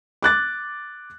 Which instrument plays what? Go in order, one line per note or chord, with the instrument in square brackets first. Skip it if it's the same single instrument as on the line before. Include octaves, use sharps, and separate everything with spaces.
[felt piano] D6 F#6 A6